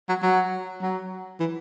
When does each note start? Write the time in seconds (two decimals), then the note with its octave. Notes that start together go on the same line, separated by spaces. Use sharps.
0.09 F#3
0.23 F#3
0.81 F#3
1.40 E3